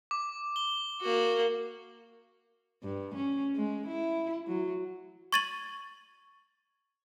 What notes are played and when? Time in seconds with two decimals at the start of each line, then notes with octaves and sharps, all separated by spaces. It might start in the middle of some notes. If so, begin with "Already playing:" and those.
0.11 D6
0.56 G7
1.02 A#3 F#4
2.83 G2
3.15 C#4
3.55 G#3
3.87 E4
4.47 F#3
5.32 C#6 G#6 A6 D#7 F#7